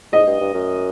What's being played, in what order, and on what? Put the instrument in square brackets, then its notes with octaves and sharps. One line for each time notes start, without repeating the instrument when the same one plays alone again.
[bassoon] G#2 [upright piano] D#5
[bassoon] G2
G2
F#2